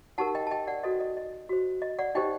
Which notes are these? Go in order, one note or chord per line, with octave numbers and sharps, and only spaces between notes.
D#4 G4 A#4 F#5 A5
D#5 G5
A5
D#5 G5
D5 F#5
F#4 A4 C5 D#5
D#5
D#5
F#4 C5
D#5
D5 F#5
D#4 G4 C5 D#5 G5